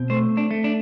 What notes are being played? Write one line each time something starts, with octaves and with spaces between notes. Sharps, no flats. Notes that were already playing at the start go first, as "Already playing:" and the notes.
Already playing: B2 C4
A3 C5
D4
A3
D4